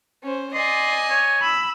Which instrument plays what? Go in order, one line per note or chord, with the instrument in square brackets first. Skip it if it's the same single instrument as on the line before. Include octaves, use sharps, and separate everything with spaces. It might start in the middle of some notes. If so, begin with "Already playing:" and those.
[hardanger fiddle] C#4 C5
[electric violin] D5 [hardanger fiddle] D#5 G#5 [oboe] C6
[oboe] C#5
[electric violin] B5 E6